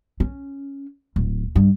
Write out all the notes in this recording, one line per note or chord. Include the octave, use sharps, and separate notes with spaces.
C#4
D1
G2